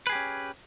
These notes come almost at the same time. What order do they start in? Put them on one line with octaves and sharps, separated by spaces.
B4 G#4 G4 C#4